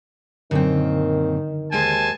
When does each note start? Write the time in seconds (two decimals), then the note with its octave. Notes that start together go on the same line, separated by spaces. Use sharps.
0.51 F#2 A#2 D3 D#3 C4
1.72 D#2 G#3 C5 G#5 A5